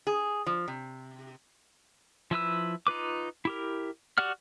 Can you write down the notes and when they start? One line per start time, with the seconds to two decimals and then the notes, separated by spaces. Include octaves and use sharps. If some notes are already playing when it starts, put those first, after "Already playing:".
0.07 G#4
0.46 F3
0.68 C3
2.31 F3 E4 B4 E6
2.87 D#4 F4 B4 D6
3.45 E4 G4 A#4
4.18 F#4 G4 D5 F#5 F6